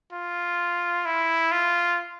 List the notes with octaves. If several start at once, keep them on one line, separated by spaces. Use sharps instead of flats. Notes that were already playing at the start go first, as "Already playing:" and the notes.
F4
E4
F4